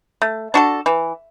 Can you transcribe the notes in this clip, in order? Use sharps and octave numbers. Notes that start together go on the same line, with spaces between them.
A3
D4 F#4 A4
E3